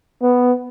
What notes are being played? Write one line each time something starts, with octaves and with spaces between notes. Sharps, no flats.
B3